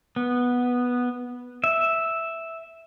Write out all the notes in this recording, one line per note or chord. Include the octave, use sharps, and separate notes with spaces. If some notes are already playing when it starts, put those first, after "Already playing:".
B3
E5